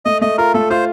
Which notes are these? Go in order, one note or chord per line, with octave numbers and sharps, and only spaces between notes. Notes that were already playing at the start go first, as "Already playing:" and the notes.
A3 D#5
A3 D#5
F4 A#4
A3 A4
F4 C5